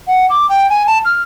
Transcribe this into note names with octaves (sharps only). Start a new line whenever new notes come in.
F#5
D6
G5
G#5
A5
F6